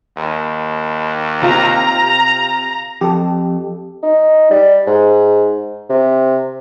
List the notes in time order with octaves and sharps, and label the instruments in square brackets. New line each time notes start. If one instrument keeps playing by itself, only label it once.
[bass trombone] D#2
[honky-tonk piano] C3 F4 G4 [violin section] A#5
[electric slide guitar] F2 [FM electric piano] G4 A4
[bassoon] D#4
G3
G#2
C3